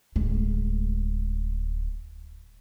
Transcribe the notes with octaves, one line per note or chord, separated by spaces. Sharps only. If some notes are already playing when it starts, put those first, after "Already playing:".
D1 G#3